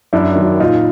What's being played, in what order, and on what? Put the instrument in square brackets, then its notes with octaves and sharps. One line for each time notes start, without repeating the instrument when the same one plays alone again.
[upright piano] F#2 D4 E4
D#3
F#3
A#2 D#4 F4